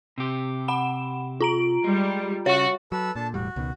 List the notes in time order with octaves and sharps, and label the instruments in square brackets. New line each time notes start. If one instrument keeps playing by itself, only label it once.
[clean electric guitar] C3 G4
[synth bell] F#5 B5 E7
F4 A#5 D7
[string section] G3 [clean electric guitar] G#3
[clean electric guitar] C#3 [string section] F#4 [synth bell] C#5 C#6
[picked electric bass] F#3 [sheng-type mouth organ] A4 B4 E6
[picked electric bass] A#2 [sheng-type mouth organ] D4 A4 A5
[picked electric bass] E1 A2 G3 [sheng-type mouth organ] F#4
[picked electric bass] C#2 B2 D#3